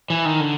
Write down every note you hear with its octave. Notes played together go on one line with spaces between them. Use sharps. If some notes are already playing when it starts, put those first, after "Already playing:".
E3
D#3
D3